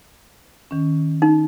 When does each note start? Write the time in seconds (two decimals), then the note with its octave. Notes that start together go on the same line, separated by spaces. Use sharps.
0.71 D#3 C#4
1.22 D#4